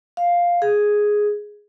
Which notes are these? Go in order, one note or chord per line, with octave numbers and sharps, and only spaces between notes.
F5
G#4